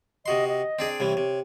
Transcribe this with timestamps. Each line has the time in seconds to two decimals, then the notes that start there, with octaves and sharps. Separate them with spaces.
0.26 C3 F#4 D#5 C6
0.48 D#5
0.79 C4 D4 G#4
1.00 C2 C3 E3 C#5
1.17 C3